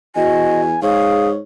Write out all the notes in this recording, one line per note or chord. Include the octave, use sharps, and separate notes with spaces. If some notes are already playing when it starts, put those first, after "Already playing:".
E2 F#4 D#5 G#5
G#2 G#4 C#5 F5